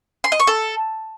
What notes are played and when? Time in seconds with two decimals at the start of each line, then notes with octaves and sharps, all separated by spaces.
0.24 C6
0.32 D#5
0.40 C#6
0.47 A4